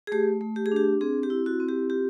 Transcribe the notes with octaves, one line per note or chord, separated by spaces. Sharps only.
G#4
A3 G4
A3
G4
G#4
D4 G4
C4 G#4
G4
E4
F#4
C4
G4
F4 G4